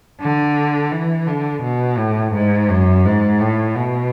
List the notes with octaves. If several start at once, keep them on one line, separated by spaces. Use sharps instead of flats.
D3
E3
D3
B2
A2
G#2
F#2
G#2
A2
B2